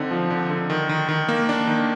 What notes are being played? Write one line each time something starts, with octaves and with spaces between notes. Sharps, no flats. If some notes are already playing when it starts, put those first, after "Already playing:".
Already playing: D3 C4 D#4
F3
D3
D3
D#3
D#3
D#3
A#3
D4
D#3